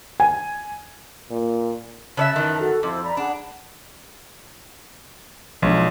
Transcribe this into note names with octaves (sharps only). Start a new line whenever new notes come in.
G#5
A#2
C#3 C#5 E5 A5 E6 F#6
F#2 D#3 E3
F#4 A4
F2 E4 C5 D6
D5 A#5 B5
D4 G#4 F#5
B1 F3 G#3 D4